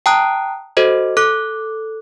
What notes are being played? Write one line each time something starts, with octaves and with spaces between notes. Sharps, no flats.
G5 A5 A#5 D#6 F#6
F#4 A4 C5 D#5
A4 D6 F#6